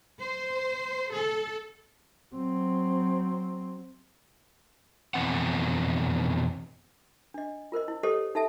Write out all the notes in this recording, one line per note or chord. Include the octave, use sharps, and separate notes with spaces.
C5
A4
F#3 C4
F2 B2 E3 C4 F#5
D4 D#5
F4 A#4 C5 D#5
E4
G4 A4 C5 C#5 D#5
D#4 A4 E5 A5